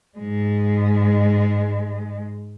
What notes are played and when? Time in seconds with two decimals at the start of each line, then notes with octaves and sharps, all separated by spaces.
0.19 G#2 G#3